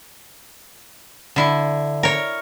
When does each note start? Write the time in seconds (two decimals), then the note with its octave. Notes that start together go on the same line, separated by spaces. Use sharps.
1.36 D3 E4
2.03 A#4 C#5